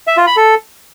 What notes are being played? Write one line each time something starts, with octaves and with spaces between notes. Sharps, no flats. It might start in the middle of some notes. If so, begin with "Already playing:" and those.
E5
F4
B5
A4